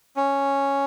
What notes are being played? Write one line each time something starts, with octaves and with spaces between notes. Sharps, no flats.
C#4